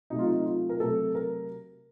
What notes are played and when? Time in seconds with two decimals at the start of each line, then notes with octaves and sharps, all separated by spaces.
0.10 C3 F#3 A3 D#4
0.18 F4
0.27 D#4
0.45 F4
0.69 A#4
0.80 C3 F#3 A3 A4
1.15 A#4